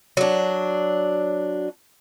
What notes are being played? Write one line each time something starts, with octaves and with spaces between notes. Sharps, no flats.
F#3 D4